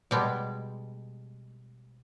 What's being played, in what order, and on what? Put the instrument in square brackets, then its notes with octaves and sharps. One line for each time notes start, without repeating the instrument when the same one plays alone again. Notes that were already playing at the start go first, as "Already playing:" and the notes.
[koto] B2 G3 G#3